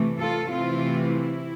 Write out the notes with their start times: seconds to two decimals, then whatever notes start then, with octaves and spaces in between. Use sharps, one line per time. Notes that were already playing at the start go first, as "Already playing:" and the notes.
Already playing: C3 E3 A3
0.19 F4 A4
0.49 C3 E3 A3 C4 E4 F4
1.09 E4